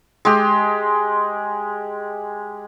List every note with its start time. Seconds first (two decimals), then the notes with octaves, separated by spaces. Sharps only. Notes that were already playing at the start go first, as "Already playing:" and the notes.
0.25 G#3 G4